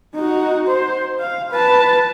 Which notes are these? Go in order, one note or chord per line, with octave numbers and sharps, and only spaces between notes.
D#4 F#4
C5
F5
B4 A5